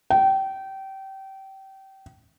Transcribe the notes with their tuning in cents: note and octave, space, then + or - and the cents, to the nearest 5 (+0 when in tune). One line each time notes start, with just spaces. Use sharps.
G5 -25